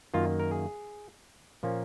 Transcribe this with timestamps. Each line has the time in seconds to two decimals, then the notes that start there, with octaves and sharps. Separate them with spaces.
0.14 F#2 D#3 A#3 F4
0.40 A#4
0.51 G#4
1.63 A#2 F3 A#3 C#4